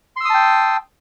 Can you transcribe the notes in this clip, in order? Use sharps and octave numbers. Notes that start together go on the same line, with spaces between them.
G5 A5 C6 D#6 E6